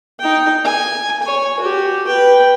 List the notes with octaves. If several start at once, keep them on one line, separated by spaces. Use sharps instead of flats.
D#4 G5
G#5
C#5 G#5
F#4 G4
B4 G5